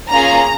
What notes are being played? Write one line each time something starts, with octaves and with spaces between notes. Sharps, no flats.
A#3 C#4 F4 G#4 A#5